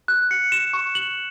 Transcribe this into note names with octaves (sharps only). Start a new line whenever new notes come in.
F#6
C#7
E7
C#6
F#7